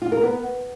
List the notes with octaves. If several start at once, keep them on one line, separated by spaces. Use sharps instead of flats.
F4
A#4
B3